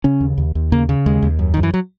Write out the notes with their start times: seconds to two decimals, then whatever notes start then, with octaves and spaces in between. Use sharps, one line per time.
0.04 C#3 C#4
0.21 D#2
0.38 D#2
0.55 D#2
0.72 C#3 A#3
0.89 C#3
1.06 D#2 G#3
1.22 D#2
1.39 F#2
1.54 F#2 D#3
1.63 E3
1.74 F#3